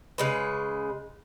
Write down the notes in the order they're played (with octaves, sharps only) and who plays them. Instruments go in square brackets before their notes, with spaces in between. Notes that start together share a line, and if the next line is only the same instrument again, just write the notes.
[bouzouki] C#3 G#3 B4